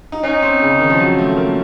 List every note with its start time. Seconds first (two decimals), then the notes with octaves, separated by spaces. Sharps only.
0.12 D#4
0.23 C#4 D#4
0.42 C4
0.62 C#3
0.80 D#3
0.90 F3
1.00 F#3
1.18 A3
1.37 A#3